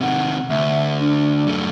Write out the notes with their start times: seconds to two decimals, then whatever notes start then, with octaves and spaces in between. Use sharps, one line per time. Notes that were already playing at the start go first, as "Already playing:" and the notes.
0.01 C3 D#3 F#5
0.50 D2 E5
1.00 D4
1.47 F#2 A3